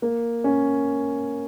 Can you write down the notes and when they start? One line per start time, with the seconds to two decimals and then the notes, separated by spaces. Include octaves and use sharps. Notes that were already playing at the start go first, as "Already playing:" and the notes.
0.02 A#3
0.44 C#4